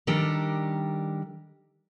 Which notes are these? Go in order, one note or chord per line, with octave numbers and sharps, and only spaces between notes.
D#3 G3 D4 G4 A4 A#4